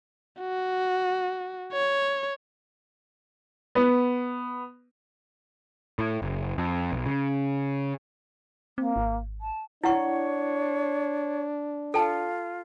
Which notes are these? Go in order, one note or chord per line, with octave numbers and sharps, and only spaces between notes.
F#4
C#5
B3
A2
F#1
F2
B1
C#3
A#3 C4
G#1
A5
D4 E4 C#5 F#5 C#6
F4 A4 G5 A5